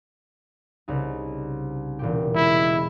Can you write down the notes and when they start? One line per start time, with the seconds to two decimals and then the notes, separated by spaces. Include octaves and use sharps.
0.88 C2 C#3 D#4
1.99 E1 A#2 G4
2.35 G#3 E4